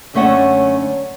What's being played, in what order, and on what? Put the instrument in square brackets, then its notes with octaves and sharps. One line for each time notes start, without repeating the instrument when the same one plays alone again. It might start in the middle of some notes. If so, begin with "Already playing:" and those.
[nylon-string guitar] F#2 D3 A3 C#4 E5 F#5